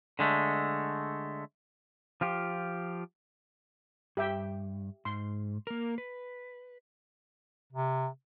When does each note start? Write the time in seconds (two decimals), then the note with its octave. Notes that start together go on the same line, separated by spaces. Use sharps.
0.19 D3 G#3 A3
2.21 F3 F4 G4
4.17 G2 G4 E5 G5
5.05 G#2 C6
5.67 A#3 A#4
5.98 B4
7.73 C3